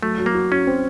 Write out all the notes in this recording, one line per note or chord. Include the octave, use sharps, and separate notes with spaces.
F#3 A3
F#3
A#3
F#4
C#4 F#4
C4